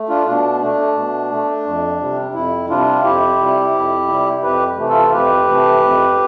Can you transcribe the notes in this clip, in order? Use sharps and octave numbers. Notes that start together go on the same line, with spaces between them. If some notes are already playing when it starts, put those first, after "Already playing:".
Already playing: A3
D4 F4
B2 D4
A3 D4
B2
A3
F2
C3 G3
F2 E4
C3 G3 D4 F4
F2 E4 G4
C3 G3
F2
C3 G3
F2 G4 B4
C3 E3 A3
F4 A4
F2 G4 B4
C3 E3 A3
F2